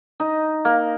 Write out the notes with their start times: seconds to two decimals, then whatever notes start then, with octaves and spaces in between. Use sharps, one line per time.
0.20 D#4
0.65 A#3